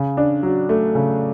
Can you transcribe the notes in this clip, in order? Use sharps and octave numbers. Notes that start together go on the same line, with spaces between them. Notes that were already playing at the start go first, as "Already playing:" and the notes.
Already playing: C#3
D4
F#3
A3
C#3